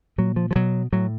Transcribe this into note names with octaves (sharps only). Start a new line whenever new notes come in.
A#2 F#3
F3
F3
B2 F#3
A2 F#3